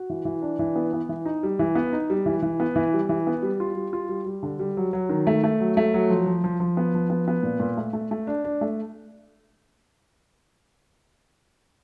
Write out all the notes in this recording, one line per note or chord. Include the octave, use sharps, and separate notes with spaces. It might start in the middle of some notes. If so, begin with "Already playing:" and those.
Already playing: F#4
E3
E3
D4
E3
B3
B3
E3
D#4
G3
E3
B3
D#4
G3
E3
E3
B3
E3
G3
E3
B3
G3
F4
G3
F4
G3
G3
D3
G3
F#3
F#3
D#3
A3
A3
F#3
A3
F#3
F3
F3
F3
F3
B3
F3
B3
B3
A#2
A#2
A3
A3
A3
D4
D4
A3